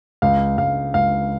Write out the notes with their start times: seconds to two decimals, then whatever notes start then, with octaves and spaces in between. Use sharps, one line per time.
0.22 C#2 F5
0.58 C#2 F5
0.94 C#2 F5